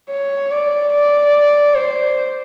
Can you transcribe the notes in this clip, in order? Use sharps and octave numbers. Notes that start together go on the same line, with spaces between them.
C#5
D5
D5
C5